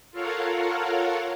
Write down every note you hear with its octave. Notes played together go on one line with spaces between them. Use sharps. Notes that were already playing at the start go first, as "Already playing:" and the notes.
F4 A4 A#4 C#5 F5 F#5